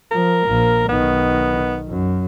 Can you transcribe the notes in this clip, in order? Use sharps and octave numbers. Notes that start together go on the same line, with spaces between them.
F3 A#4
A#1 A#3
B1 D#3 B3
F#2